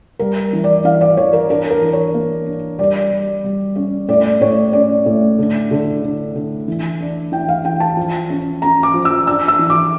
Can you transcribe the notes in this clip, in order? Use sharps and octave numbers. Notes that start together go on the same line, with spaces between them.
G3 A#4
E3
D5
E3 F5
D5
E3 C#5
A#4
D4 A#4
A#4
E3
C#5
A#3
D4
G3 D5
G3
G3
C#4
A2 D5
A2 C#5
C#4 D5
A2
D3
D3
D3
D3
E3
D4
E3 G5
F5
E3 G5
A5
F3
C#4
C#4 A#5
D6
F3
E6
D4 E6
E6
E3
D6